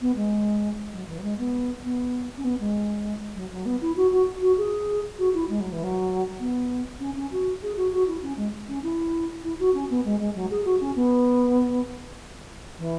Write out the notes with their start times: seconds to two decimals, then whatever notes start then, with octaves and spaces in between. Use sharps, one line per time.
0.01 B3
0.16 G#3
0.93 F#3
1.08 E3
1.18 F#3
1.23 G#3
1.38 B3
1.84 B3
2.37 C#4
2.44 B3
2.60 G#3
3.35 F#3
3.51 F#3
3.65 B3
3.81 E4
3.96 F#4
4.11 F#4
4.42 F#4
4.58 G#4
5.18 F#4
5.34 E4
5.49 G#3
5.60 F#3
5.72 E3
5.84 F#3
6.39 B3
7.00 C#4
7.16 C#4
7.32 F#4
7.62 G#4
7.77 F#4
7.93 F#4
8.07 E4
8.22 C#4
8.37 G#3
8.69 C#4
8.83 E4
9.43 E4
9.59 F#4
9.74 C#4
9.90 B3
10.05 G#3
10.20 G#3
10.35 F#3
10.51 G#4
10.65 F#4
10.81 C#4
10.96 B3
12.79 E3